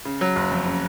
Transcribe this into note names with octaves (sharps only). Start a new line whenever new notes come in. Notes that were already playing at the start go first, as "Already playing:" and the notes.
C#3
F#3
F#1
F2
C#3